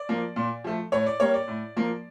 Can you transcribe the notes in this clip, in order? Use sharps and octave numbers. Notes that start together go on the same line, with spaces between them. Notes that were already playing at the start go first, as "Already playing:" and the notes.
Already playing: D5
F3 A#3
A#2
F3 A3
A2 C#5
D5
G3 A#3 C#5
D5
A2
F3 A#3